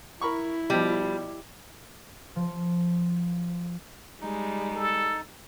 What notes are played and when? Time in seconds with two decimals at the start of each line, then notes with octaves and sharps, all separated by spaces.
0.21 E4 A#4 B5 C#6
0.70 B2 F3 G3
2.36 F3
4.22 G3 G#3 D#4
4.75 A4